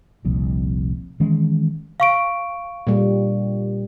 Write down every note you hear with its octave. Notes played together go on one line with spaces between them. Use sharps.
F1 C2 F2 A#2
D#3 E3 G#3 C#4
F5 C#6 D7
A#2 G3